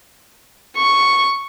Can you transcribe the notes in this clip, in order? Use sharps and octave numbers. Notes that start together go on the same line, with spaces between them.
C#6